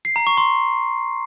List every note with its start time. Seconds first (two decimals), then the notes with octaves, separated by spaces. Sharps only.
0.05 C7
0.16 A#5
0.27 C#6
0.37 C6